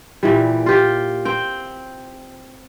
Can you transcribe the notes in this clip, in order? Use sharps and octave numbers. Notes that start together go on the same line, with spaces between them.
A#2 E3 G3
F4 G4
C4 G5